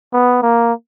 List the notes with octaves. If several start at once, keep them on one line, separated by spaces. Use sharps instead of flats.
B3
A#3